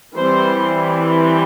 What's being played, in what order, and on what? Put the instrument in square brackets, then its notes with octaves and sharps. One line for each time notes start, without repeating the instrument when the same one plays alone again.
[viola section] E3 G3 C4 C5